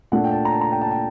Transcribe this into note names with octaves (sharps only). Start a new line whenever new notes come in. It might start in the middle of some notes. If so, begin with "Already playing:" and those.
A#2 A3 D4 F#5
G5
A5
A#5
A5
A#5
G5
A5
G5